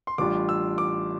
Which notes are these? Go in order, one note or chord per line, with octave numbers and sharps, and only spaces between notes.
C6
A1 A2 G3 D4 F4 D6
E6
D6